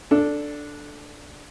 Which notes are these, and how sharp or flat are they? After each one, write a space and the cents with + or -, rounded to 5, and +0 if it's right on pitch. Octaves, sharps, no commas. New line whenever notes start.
D4 +0 A4 +0